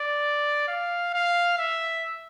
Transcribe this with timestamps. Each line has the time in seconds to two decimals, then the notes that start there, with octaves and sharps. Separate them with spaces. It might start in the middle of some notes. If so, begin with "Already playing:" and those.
Already playing: D5
0.68 F5
1.14 F5
1.58 E5